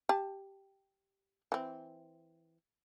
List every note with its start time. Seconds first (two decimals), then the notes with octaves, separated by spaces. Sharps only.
0.09 G4 A5
1.52 E3 C4